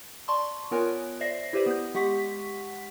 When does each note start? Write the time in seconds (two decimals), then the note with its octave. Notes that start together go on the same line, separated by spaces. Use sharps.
0.28 D5 A5 C6 C#6
0.71 B3 F4 A#4 C#5 G#5 F#6
1.20 C5 D5 E5 A#6 C7
1.53 E4 G4 B4 C5 D5
1.66 B3 G6
1.95 G#3 G4 F#5 C#6 B6